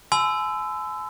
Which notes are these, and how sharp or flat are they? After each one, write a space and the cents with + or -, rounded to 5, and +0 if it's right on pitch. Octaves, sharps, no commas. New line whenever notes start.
G#5 +40 C6 -45 E6 +5